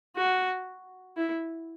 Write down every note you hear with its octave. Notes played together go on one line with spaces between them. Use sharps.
F#4
E4